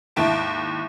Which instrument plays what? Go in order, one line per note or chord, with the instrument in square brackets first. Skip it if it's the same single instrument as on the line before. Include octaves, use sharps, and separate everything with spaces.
[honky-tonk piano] D#2 G#2 E4 A5 D7